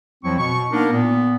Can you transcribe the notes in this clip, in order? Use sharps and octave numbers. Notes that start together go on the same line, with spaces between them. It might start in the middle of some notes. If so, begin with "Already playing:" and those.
F2 F3 F#3 C4 E4 C#6
B2 C#6
A#3 B3 D4 D#4 A#4
A#2 B3